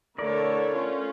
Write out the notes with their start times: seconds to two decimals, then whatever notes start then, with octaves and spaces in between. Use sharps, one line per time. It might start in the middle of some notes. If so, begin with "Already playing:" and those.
0.18 D3 A3 E4 A4 A#4 C#5 D5
0.72 A3 C#4 F4